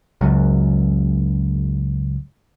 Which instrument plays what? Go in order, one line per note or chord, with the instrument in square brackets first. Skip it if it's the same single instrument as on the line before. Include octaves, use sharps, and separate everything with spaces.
[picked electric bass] F#1 C#2 F#2